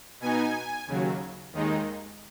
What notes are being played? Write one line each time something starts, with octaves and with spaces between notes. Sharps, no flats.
B2 B3 D#4 G#5
D#2 C#3 F#3
D#2 D#3 G#3 D#4